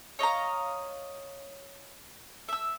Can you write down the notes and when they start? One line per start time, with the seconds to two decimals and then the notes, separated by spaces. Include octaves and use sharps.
0.19 C#5 D#5 F5 A#5
2.49 E5 E6